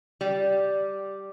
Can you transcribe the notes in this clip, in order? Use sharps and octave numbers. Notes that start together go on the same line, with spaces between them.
G3